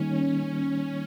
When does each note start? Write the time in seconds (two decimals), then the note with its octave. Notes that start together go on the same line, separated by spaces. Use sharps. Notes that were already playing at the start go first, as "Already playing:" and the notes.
Already playing: D#3 G3 A#3 C#4 D#4
0.12 C#4